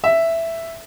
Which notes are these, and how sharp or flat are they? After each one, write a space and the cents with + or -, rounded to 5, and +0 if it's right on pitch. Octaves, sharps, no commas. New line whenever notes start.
E5 +5